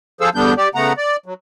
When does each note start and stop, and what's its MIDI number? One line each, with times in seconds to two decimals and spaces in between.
0.21 0.29 53
0.21 0.29 68
0.21 0.29 69
0.21 0.29 72
0.21 0.29 77
0.21 0.29 88
0.35 0.54 40
0.35 0.54 50
0.35 0.54 55
0.35 0.54 59
0.35 0.54 62
0.35 0.54 91
0.57 0.69 67
0.57 0.69 74
0.75 0.93 49
0.75 0.93 57
0.75 0.93 59
0.75 0.93 78
0.75 0.93 82
0.97 1.16 74
1.26 1.34 54